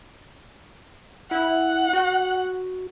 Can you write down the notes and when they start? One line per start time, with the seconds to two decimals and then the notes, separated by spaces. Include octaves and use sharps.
1.31 E4 F#5
1.93 F#4